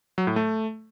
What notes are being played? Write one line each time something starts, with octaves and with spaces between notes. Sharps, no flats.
F#3
A2
A3